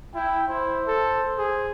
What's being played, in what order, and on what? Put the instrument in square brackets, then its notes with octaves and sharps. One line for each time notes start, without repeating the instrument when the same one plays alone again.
[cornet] E4 [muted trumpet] G5
[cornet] E4 [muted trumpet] C5
[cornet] A4
G#4